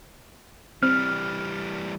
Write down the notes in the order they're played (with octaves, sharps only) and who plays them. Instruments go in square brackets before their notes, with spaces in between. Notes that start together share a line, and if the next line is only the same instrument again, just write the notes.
[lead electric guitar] E3 G3 [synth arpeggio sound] C4 [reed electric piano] F6